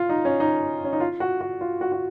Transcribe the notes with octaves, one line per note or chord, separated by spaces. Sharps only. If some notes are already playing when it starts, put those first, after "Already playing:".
Already playing: F4
D#4
C#4
D#4
C#4
D#4
F4
F#4
F#4
F4
F#4
F#4